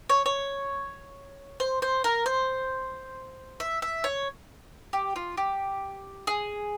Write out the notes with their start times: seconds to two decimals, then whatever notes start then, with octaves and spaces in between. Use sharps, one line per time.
0.09 C#5
0.26 C#5
1.60 C5
1.82 C5
2.04 A#4
2.26 C5
3.60 E5
3.82 E5
4.04 C#5
4.93 G4
5.16 F4
5.37 G4
6.27 G#4